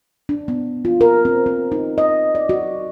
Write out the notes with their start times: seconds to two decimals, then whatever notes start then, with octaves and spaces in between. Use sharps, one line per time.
0.29 D4
0.48 B3
0.85 F4
1.01 A#4
1.25 C4
1.46 C4
1.72 D#4
1.98 D#5
2.35 D5
2.49 F#4